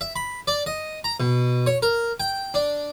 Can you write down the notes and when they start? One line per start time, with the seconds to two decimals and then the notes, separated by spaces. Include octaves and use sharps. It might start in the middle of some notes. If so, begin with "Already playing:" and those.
0.01 E5
0.16 B5
0.47 D5
0.66 D#5
1.04 A#5
1.20 B2
1.66 C#5
1.82 A#4
2.20 G5
2.54 D4